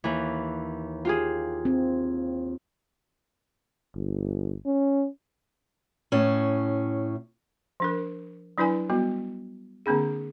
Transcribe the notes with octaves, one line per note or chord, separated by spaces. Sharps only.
D#2 E3
F4 G4 G#4
C4
G1
C#4
A2 C#4
F3 D4 A#4
F#3 D4 E4 B4 D5 G#5
G3 B3 F#4
D3 A#3 C4 D4 G#4